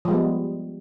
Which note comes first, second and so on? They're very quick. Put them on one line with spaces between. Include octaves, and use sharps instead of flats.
F3 G#3 G3 B3